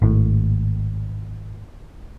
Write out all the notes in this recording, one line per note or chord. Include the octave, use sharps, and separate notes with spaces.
G#1 A2